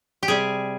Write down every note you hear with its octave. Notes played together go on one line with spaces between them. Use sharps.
G4
C3 G3 G#4